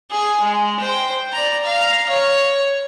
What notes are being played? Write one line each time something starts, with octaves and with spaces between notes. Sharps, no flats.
G#4 G#5
G#3
C5 G5
D5 A#5
F5 A#5
C#5